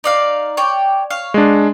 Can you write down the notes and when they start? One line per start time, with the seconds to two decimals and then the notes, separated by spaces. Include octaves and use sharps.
0.04 D#4 D5 F5
0.57 C#5 D5 G5
1.10 C#5 F5
1.34 G#3 D4